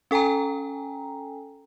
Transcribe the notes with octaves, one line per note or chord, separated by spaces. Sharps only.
C#4 A4 G5 G#5 A#5